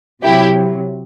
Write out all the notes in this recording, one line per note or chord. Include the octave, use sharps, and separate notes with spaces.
C3 F#3 E4 G4